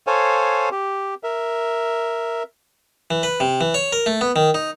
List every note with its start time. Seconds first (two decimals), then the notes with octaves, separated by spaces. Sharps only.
0.07 A4 C5 C#5 F5 G#5
0.71 G4
1.23 A#4 E5
3.11 E3
3.23 B4
3.40 C3
3.61 E3
3.74 C#5
3.93 A#4
4.06 A3
4.21 B3
4.36 D#3
4.54 D#4